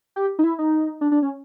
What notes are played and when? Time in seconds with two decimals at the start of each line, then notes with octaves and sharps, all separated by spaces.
0.16 G4
0.39 D#4
0.44 E4
0.59 D#4
1.01 D4
1.12 D4
1.22 C#4